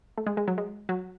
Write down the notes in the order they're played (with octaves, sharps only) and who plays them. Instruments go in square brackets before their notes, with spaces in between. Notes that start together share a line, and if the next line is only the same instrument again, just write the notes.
[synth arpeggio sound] A3
G#3
G#3
F#3
G#3
F#3